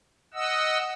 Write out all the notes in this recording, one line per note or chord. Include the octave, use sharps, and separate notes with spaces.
D#5 F#5 E6